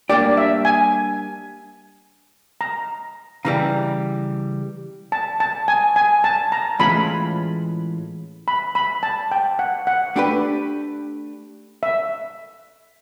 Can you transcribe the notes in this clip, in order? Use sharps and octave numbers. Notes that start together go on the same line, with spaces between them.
G3 A#3 D4 G4 D5
E5
G#5
A#5
C#3 E3 G3 A#5
A5
A5
G#5
G#5
A5
A#5
A2 E3 G#3 C#4 F4 B5
B5
B5
A5
G5
F#5
F#5
A3 D4 G4 B4
E5